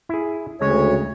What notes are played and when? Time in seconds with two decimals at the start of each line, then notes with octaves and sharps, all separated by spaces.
0.09 E4 G#4
0.61 D2 C#3 G#3 C#5